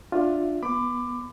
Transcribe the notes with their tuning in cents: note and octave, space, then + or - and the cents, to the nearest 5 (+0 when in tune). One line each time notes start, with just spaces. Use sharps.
D4 +10 F4 +15 E5 +15
B3 -15 B5 +30 D6 +15